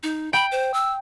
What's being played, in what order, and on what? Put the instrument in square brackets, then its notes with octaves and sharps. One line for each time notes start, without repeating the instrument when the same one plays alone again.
[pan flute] D#4
[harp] G5 [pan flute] B5
[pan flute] C5
E6